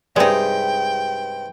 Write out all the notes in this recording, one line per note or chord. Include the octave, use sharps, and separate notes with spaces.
G2 C3 G#3 D#4 D5 G5